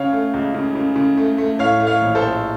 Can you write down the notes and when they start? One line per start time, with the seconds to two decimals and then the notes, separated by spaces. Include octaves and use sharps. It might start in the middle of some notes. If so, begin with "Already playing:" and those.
Already playing: C#3 C#5 F5
0.13 A3
0.34 C#2
0.54 C#3
0.75 C#3
0.96 C#3
1.17 A3
1.38 A3
1.59 A2 C#5 F5
1.80 A3
1.87 C#5 F5
2.02 A#1
2.15 A4 C5
2.23 A#1